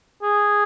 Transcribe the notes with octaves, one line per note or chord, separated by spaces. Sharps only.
G#4